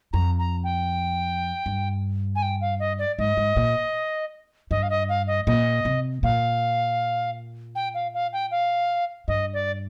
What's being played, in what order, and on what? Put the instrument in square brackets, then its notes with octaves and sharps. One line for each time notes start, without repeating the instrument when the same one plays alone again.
[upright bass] F2 [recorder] A#5
[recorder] A#5
G5
[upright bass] G2
[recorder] G#5
G5
F5
D#5
D5
[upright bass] G#2 [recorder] D#5
[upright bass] G#2
A#2
[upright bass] G2 [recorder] D#5
[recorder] F5
D#5
F5
D#5
[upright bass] A#2 [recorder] D#5
[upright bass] C3
[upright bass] A#2 [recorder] F5
[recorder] G5
F5
F5
G5
F5
[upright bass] G2 [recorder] D#5
[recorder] D5